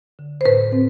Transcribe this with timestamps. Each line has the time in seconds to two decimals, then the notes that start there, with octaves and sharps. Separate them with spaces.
0.19 D3
0.41 C5
0.46 A2 B4
0.72 C4